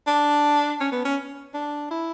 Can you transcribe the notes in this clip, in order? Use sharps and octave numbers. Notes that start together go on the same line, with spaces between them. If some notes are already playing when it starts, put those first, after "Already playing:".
D4
C#4
B3
C#4
D4
E4